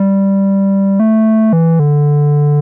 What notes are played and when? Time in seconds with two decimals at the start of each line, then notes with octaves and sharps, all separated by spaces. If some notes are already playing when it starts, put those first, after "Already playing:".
Already playing: G3
1.00 A3
1.53 E3
1.79 D3